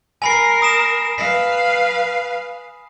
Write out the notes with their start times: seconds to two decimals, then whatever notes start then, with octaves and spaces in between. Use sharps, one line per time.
0.22 A#4 G#5 B5 C7
0.62 D#6 A#6 E7
1.18 B4 F5 B6